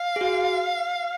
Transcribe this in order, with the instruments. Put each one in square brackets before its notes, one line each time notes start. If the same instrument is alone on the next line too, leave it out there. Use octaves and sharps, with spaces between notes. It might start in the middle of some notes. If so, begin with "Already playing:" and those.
Already playing: [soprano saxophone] F5
[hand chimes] G#4
F#4